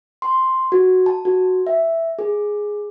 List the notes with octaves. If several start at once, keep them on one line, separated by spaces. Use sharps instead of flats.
C6
F#4
A5
F#4
E5
G#4